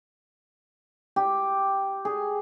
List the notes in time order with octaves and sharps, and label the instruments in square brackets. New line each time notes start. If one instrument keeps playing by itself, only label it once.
[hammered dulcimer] G4
G#4